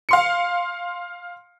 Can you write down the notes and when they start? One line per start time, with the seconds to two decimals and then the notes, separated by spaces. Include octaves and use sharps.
0.09 F5 C6 C#7